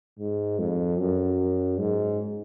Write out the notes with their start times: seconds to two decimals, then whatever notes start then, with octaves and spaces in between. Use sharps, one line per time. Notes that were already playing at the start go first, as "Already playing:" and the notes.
0.19 G#2
0.59 F2
0.99 F#2
1.79 G#2